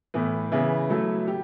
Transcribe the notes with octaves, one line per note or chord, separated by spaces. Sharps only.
A2 E3 B3
C#3 E3 B3 E4
F#3 A3 E4 A4
G4